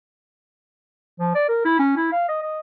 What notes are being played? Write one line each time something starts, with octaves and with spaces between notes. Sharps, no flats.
F3
D5
A#4
E4
C#4
E4
F5
D#5
D#5